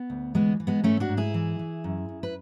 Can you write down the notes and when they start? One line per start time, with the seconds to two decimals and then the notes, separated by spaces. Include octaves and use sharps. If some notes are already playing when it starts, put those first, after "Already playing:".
Already playing: B3
0.10 D2
0.35 E3 G#3 B3
0.60 E3
0.67 G#3 B3
0.84 G#2 A3 C#4
1.00 D4 F#4
1.09 G#2
1.17 E4 G#4
1.34 E3
1.59 E3
1.84 F#2
2.09 F#2
2.23 B4